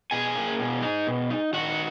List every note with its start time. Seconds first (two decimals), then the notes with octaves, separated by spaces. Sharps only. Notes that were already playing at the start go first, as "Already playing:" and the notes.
0.11 B2 G#4 G#5
0.35 A#3
0.59 B2
0.82 D#4
1.07 B2
1.30 D#4
1.53 D#3 F#4 F#5